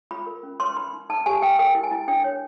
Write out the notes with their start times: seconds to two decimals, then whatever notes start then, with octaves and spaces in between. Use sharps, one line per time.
0.11 F4 B5
0.26 A#4
0.43 C#4
0.60 B4 C6
0.76 D#4 B5
0.93 D#4
1.10 D#4 A5
1.26 G4 G#5
1.42 B4 G5
1.59 A#4 G5
1.75 E4
1.83 G#5
1.91 E4
2.08 D4 G5
2.24 C#5